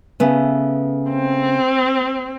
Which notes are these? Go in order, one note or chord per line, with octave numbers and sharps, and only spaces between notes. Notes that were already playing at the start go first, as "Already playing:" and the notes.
C#3 A3 B3
C4